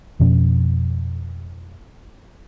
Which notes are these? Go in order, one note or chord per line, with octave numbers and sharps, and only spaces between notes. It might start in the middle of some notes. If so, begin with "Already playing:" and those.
F2 B2 F3 C#4